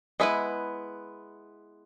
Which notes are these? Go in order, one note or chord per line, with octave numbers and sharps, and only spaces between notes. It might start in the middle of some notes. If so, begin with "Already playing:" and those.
G#3 B3 E4 G#4 B4